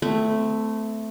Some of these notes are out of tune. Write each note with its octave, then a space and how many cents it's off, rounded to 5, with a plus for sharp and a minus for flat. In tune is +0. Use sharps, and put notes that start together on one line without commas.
A3 +0 C4 -35